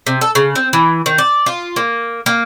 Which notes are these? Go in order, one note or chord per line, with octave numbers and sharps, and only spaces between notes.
C3
A4
C#3
C4
E3
D#3
D5
F4
A#3
A#3